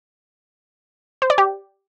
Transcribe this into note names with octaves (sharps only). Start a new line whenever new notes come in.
C5
D5
G4